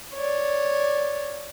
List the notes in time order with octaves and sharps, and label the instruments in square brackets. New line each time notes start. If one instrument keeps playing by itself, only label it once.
[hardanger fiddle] C#5 D5